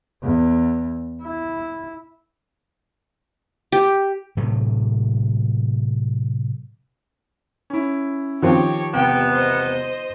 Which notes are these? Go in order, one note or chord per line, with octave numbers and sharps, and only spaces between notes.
E2
E4
G4
A2 C3 F#3
C#4 E4
D#3 F3 C4 G4 C#5
E1 C3 B3 G5
C5 D#5